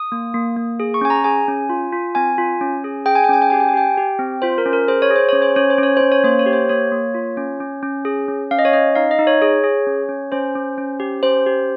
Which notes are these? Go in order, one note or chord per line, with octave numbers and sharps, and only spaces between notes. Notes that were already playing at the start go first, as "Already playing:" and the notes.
Already playing: D#6
A#3
A#3
A#3
G#4
C#6
C#4 G#5
A#5
G#4 G#5
C#4
F4
F4
C4 G#5
F4
C#4
G#4
G#4 G5
G#5
G5
C#4 G#5
G5
G4 G#5
G5
G#5
G4 G5
G4
C4
F4 C5
A#4
C#4
A#4
G#4 C5
C#5
G#4
C5
C#4 C#5
C5
C#4 C#5
C5
C#4 C#5
C#4 C5
C#5
A#3 C5
C#5
G4
C5
A#3 C#5
A#3
F4
C#4
C#4
C#4
G#4
C#4
C#4 F5
D#5
C#5
C#4 D#5
D#4 F5
D#5
D#4
C#5
G#4 C#5
G#4
C#4
C#4
C#4 C5
C#4
C#4
G4
C#4 C5
G4